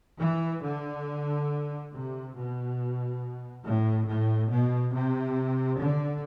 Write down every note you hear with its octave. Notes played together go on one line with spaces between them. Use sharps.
E3
D3
C3
B2
A2
A2
B2
C3
D3